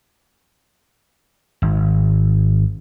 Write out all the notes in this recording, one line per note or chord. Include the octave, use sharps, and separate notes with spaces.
G#1